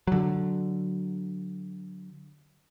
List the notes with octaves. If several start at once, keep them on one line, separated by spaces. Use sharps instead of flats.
D3 F#3